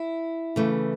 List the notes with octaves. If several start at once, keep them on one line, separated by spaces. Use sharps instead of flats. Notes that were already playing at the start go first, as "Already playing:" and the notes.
Already playing: E4
C#3 E3 A3